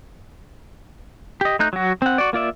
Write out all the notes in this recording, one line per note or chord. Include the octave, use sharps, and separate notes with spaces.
G4 D#5
A3 D#4 F#6 G6
F#3 F#4
C4 F#5
F#4 D5
A#3 F4 D5 E5